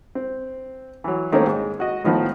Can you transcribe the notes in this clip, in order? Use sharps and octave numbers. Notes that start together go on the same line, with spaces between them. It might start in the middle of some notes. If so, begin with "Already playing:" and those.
C4
E3 F#3
D#3 A3 A#3 C4 C#4
G#2
F#4 D#5
A2 D#3 F3 B3 F#4